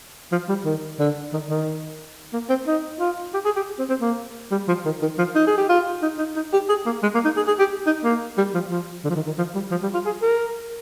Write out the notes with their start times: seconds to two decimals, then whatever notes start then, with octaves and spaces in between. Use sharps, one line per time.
0.32 F3
0.49 G3
0.65 D#3
0.99 D3
1.33 D#3
1.50 D#3
2.33 A#3
2.50 C4
2.67 D#4
3.00 F4
3.34 G4
3.45 G#4
3.56 G4
3.79 C4
3.89 C4
4.01 A#3
4.52 G3
4.68 F3
4.85 D#3
5.02 D#3
5.18 F3
5.35 D#4
5.47 G#4
5.58 G4
5.69 F4
6.03 D#4
6.19 D#4
6.36 D#4
6.53 G4
6.69 G#4
6.86 A#3
7.03 G#3
7.15 A#3
7.25 D#4
7.37 G#4
7.48 G#4
7.59 G4
7.87 D#4
8.04 A#3
8.38 G3
8.54 F3
8.70 F3
9.04 D3
9.10 F3
9.16 D#3
9.27 D#3
9.38 F3
9.55 G3
9.71 F3
9.83 G3
9.94 F4
10.06 G#4
10.22 A#4